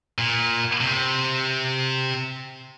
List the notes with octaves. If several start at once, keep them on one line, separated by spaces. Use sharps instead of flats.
A#2
C3